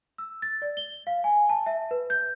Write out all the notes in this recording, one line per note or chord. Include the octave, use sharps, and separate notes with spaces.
E6
A6
D5
G7
F5
G#5
A5
E5
B4
G6